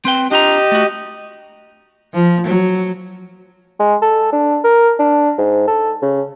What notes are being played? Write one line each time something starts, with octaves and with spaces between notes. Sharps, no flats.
C4 B4 G5
D4 F4 G4 D#5 A#5
A3 F#4
F3
F#3
G#3
A4
D4
A#4
D4
G#2
A4
C#3